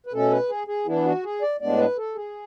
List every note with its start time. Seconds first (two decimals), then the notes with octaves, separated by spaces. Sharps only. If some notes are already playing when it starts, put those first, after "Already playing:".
0.06 B4
0.13 B2 A3 C#4 A4
0.31 B4
0.49 G#4
0.67 G#4
0.86 E3 B3 D4 E4
1.05 F#4
1.24 G#4
1.42 D5
1.60 A2 G#3 B3 D4 D5
1.78 B4
1.97 A4
2.15 G#4